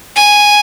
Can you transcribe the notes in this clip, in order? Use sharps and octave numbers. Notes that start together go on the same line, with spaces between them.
G#5